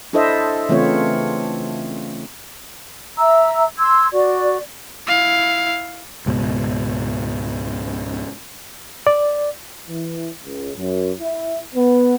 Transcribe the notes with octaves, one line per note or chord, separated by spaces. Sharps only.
D4 E4 A4 C5 D#5 E5
C#3 E3 A3 C4 F4 C#5
E5 A#5 E6
C6 E6 G#6
F#4 D5
E4 F5
C#2 G#2 B2
D5
E3
C#2
F#2
E4
B3